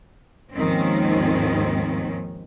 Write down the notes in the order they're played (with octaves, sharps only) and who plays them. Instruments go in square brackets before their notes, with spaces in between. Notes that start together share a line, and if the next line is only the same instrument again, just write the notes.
[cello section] D#2 G#2 D#3 F3 C4 C#4